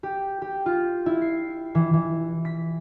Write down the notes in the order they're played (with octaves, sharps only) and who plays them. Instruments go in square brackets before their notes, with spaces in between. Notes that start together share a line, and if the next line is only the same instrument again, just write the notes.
[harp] G4
G4
F4
E4
C7
E3
E3
B6